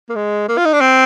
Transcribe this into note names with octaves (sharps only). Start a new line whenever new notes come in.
A#3
G#3
A#3
F4
D#4
D4
C4